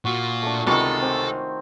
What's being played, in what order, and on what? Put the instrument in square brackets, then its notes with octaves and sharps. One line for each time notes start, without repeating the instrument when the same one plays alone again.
[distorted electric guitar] A#2 F4 [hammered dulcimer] F#4
[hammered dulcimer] A3 D4
[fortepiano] C#2 C3 [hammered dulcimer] D#3 C#5 B5 [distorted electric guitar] A4
[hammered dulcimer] C4